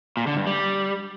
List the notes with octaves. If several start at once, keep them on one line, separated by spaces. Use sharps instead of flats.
A#2
D3
G2
G3